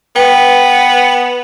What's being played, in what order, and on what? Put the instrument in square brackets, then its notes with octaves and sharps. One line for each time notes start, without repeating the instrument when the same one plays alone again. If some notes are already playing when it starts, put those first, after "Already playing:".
[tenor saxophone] B3 [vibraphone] B4 G5